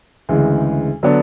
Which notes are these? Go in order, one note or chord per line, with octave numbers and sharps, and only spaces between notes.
D2 C#3 E3 G#3
D3 F#3 B3 D4